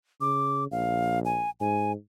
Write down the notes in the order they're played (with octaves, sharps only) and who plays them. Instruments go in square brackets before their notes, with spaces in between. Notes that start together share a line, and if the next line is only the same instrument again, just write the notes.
[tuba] C#3 [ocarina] D6
[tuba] A#1 [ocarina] F5
[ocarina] G#5
[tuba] G#2 [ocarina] G#5